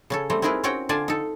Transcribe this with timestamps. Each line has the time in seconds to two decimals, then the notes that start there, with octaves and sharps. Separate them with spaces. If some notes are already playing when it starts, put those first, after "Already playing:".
0.10 C#3 C#4 A4
0.30 G3 A3 C4
0.42 C4 D#4 E4 G#4 A#4 B4
0.64 C4 C#4 F#4 C#5 G5 A#5
0.89 D3 F4 D5 G#5 A5
1.08 D#4 A4